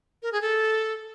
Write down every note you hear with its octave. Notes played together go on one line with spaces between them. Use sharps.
A#4
G#4
A4